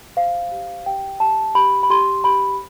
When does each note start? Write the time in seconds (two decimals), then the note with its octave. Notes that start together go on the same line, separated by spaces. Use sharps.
0.17 C5 F5
0.51 G4
0.86 G4 G5
1.20 G4 A5
1.55 G4 B5
1.83 B5
1.90 G4 C6
2.24 G4 B5